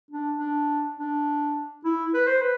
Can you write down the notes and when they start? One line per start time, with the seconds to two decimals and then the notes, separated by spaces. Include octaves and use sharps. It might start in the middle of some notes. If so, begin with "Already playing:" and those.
0.11 D4
0.39 D4
0.97 D4
1.85 E4
2.14 B4
2.27 C5
2.42 B4